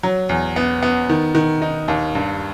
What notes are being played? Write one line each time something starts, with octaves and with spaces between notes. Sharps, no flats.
F#3
E2
B3
B3
D#3
D#3
D#4
D#2
G2